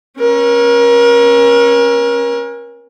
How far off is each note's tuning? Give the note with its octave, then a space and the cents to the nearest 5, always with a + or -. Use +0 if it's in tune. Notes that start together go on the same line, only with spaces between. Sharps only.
C#4 -20 A#4 +35